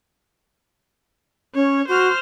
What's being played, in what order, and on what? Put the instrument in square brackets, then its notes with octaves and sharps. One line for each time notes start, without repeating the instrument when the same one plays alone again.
[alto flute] C#4 [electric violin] C#5
[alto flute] F#4 [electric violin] C5 F6